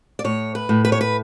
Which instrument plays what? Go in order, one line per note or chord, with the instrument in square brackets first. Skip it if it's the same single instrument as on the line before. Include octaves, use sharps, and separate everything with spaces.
[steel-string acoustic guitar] D5
A2 C#5
B4
A2
B4
C#5
B4